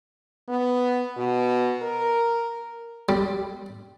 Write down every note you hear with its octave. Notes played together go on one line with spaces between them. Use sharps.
B3
B2
A#4
G3